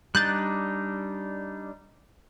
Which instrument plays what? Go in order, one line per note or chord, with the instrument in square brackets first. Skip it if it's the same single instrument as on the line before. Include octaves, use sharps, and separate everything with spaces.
[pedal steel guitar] G3 D4 D#4 [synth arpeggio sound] F#6 G6 A6